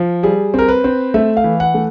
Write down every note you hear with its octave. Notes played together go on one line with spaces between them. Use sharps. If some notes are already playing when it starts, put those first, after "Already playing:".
Already playing: F3
G3 G#4
C4 A#4
B4
C4
A3 E5
F5
E3
F#5
A3